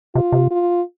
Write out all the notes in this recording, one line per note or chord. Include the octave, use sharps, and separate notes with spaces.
C3 F4
C3
F4